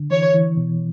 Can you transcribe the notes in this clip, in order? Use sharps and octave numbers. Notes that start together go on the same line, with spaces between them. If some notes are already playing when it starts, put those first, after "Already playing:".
Already playing: D3
E3 C#5
E3
B2